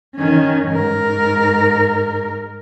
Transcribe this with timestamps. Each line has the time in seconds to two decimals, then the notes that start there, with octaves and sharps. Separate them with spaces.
0.15 D#3 C#4
0.68 G#2 A#4